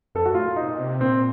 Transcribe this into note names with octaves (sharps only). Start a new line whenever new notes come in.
F2 A4
F#2 F#4
A2 F4
A#2
C3 D#4
A#2
C3
A#2 C4